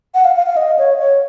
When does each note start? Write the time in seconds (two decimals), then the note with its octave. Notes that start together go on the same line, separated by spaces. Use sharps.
0.15 F#5
0.25 F5
0.36 F5
0.46 F5
0.57 D#5
0.79 C#5
0.99 C#5